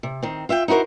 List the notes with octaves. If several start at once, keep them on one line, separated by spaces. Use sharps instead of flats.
C3
D#3 C4
F4 E5 F#5 G5
D#4 E4 F#4 A#4 C5